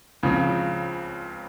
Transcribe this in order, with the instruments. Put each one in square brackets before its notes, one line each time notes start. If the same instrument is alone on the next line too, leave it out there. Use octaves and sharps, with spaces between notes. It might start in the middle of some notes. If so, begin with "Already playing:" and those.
[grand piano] C#2 C#3 F3 C4 F4